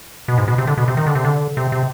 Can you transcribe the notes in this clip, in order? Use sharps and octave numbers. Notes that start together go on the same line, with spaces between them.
B2
G#2
B2
C3
D3
B2
C3
D#3
D3
C3
D3
C3
C3